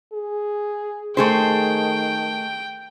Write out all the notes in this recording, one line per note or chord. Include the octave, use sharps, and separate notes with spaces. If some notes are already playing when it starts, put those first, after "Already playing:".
G#4
D#3 A3 G#4 C5 G5